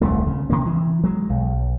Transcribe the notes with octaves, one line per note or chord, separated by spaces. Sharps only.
D#1 C2 A3
C#3
C3 A#3
E3
F#3 G#3
B1